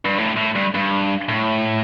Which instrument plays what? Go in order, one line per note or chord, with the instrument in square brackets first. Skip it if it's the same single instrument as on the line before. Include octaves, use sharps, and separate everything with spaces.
[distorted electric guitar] G2
A2
A2
G2
G2
A2